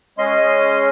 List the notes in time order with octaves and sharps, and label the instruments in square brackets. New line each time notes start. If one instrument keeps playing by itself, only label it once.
[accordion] G#3 C#4 C6 [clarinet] D#5